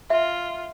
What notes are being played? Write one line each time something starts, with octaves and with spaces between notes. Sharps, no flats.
F4 E5